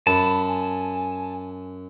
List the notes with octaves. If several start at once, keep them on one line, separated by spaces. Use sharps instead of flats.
F#2 A5 B5
G#5